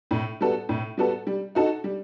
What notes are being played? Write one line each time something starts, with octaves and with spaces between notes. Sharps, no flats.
A2
G3 B3 F#4 A4
A2
G3 B3 F#4 A4
G3
D#4 F#4 A4
G3